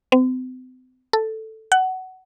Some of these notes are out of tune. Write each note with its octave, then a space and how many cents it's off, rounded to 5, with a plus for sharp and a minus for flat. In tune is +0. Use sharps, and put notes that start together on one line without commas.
C4 -40
A4 +0
F#5 +15